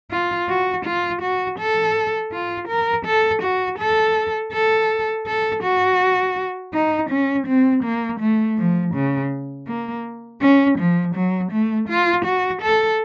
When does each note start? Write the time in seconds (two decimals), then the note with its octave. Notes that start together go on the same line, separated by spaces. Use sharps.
0.11 F4
0.49 F#4
0.85 F4
1.22 F#4
1.59 A4
2.32 F4
2.68 A#4
3.06 A4
3.42 F#4
3.79 A4
4.53 A4
5.27 A4
5.63 F#4
6.73 D#4
7.10 C#4
7.47 C4
7.84 A#3
8.20 A3
8.58 F3
8.94 C#3
9.68 A#3
10.41 C#4
10.79 F3
11.15 F#3
11.52 A3
11.89 F4
12.25 F#4
12.62 A4